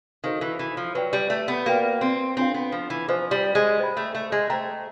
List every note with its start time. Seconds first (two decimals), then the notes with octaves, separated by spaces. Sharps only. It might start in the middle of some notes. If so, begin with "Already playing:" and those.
0.24 D#3 F#4 A4 C5 F5
0.41 E3
0.59 E3
0.77 F3
0.95 F#3 B4 D5 G5
1.13 G3
1.30 A3
1.48 B3
1.66 A#3 F#4 B4 D5 G5
2.01 C4
2.37 C4 D4 F4 A4 C#5 F5
2.54 B3
2.72 F3
2.90 E3
3.08 F3 G#4 C5 D#5 G#5 C#6
3.31 G3
3.55 G#3
3.80 C5 D#5 G5 B5
3.97 A3
4.15 A3
4.32 G#3
4.50 A3 C5 E5 G5 A#5